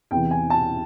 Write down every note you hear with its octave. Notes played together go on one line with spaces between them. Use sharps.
E2 C3 E3 G5
G#5
A5